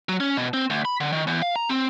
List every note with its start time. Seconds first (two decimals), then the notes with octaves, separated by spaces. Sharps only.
0.09 F#3
0.20 C#4
0.37 B2
0.53 C4
0.70 D2
0.85 B5
1.00 D3
1.12 D#3
1.27 E2
1.42 F5
1.56 A#5
1.69 C4